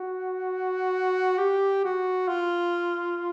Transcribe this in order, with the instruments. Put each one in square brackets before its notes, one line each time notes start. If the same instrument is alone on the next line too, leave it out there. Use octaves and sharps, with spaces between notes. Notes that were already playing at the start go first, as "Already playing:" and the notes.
Already playing: [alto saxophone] F#4
G4
F#4
F4